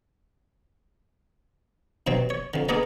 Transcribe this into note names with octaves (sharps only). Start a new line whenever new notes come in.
G2 B2 F#3 C4
C#5
F2 D3
G#3 B3 D4 G#4 A#4 D5